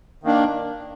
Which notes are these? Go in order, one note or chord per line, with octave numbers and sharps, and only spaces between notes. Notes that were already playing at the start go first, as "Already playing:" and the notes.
D#3 A#3 D4